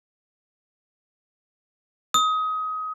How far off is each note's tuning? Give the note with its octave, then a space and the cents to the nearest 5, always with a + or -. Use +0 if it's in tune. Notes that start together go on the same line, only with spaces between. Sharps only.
D#6 +25